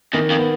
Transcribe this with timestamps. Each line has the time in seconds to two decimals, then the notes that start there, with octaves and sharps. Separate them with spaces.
0.13 E2 D#3
0.30 F2
0.39 B3